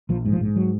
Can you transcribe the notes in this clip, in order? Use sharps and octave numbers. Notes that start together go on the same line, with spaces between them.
A#1 F3
G#2
F3
G#2
F#3